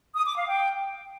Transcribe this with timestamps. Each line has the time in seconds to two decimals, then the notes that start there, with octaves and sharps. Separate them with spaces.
0.15 D#6
0.26 D6
0.37 F5
0.48 G5